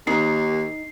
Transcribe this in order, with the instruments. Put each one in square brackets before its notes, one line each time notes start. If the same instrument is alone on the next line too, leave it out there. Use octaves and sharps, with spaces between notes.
[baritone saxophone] D#2 [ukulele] D#4 [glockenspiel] C7